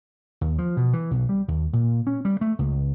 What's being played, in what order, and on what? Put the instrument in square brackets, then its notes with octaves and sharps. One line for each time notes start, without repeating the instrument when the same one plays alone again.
[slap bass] D#2
F3
B2
E3
B1
G3
D#2
A#2
C#4
G3
A3
C#2